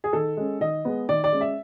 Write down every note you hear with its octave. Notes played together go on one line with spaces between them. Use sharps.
G#4
D#3 A4
G#3 C#4
D#3 D#5
G#3 B3
D#3 D5
D5
G#3 C#4
E5